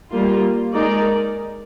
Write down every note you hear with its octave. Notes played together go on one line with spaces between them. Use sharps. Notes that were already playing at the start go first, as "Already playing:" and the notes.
G3 A#3 F4
G#3 D#4 A#4 D5